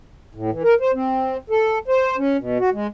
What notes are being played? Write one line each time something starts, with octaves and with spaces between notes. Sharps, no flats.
A2
E3
A#4
C5
C4
A4
C5
C#4
B2
F#4
G#3